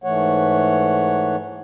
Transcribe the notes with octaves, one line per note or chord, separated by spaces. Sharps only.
G#2 E3 A3 C#5 F#5